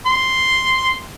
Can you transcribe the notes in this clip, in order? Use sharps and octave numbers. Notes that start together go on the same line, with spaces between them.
C6